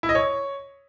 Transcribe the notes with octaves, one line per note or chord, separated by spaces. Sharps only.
E4
D#5
C#5